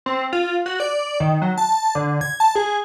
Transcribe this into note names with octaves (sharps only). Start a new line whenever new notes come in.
C4
F4
F#4
D5
D#3
F#3
A5
D3
G#6
A5
G#4